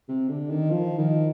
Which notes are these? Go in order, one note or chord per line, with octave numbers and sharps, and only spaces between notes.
C3
D3
D#3
F3
D#3